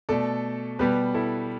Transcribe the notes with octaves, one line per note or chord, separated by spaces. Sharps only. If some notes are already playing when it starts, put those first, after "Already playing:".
B2 A3 A4 D5
B2 G3 B3 G4 B4
E4 A4